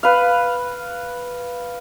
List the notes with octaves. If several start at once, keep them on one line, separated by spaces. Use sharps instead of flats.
B4 F5